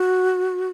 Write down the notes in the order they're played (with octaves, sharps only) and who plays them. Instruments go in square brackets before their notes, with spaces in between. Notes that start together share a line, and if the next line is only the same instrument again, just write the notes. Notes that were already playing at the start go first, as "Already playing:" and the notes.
Already playing: [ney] F#4